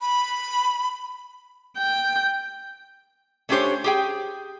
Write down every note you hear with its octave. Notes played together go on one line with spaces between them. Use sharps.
B5
G5
A3 C#4 D4 G4 C5 C#5
G4 G#4 G5